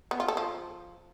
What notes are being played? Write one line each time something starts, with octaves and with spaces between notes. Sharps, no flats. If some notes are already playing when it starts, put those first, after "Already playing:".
B3
F4
A4
F3